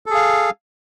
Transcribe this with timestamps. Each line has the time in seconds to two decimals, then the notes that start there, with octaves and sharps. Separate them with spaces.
0.06 A4
0.11 G#4
0.15 F5